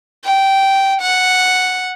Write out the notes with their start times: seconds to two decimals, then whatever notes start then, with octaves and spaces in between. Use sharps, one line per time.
0.24 G5
1.01 F#5